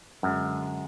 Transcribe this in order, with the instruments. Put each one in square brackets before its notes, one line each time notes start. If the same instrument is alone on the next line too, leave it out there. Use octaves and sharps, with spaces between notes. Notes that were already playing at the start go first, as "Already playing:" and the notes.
[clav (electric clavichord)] F#2 [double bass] D3 G#3